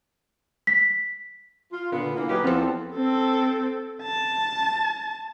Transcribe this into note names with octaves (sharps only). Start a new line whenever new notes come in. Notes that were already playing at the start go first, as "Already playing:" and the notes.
B6
F4
A#2 D3 B3
E3 A#3
F#3 D#4 G4 G#4 A#4 B4
E2 F3 B3 C4 A4
C4 A4
A5